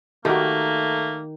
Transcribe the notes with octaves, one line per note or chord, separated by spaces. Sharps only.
D#3 A3 A#3 F#4 G4